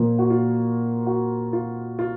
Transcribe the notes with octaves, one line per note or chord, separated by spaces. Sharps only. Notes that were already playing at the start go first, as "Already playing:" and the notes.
Already playing: A#2 F3 A#3
F#4
F4
F#4
F4
F4